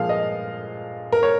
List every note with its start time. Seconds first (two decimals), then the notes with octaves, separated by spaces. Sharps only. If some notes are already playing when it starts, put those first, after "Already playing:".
Already playing: A#2 F3 G#3 F5
0.09 D#5
1.12 A#4
1.23 C#5